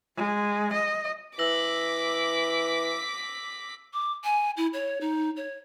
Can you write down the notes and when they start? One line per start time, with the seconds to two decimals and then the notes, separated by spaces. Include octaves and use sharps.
0.16 G#3
0.73 D#5
1.39 E3 D6 E6 A#6 B6 F#7
3.93 D6
4.24 G#5
4.57 E4
4.73 C#5
5.01 D#4
5.36 C#5